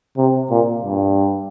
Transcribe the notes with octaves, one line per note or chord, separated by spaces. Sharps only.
C3
A#2
G2